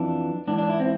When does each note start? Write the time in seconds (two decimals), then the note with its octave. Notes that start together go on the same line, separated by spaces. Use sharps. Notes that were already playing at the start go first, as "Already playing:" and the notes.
Already playing: F2 E3 D4
0.47 G#2 E3 D4
0.58 D4
0.70 E4
0.80 C4